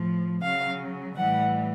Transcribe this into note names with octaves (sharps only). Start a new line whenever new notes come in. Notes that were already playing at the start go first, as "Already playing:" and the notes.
Already playing: A2 F3
C#3 F#3 F5
A2 E3 G3 F#5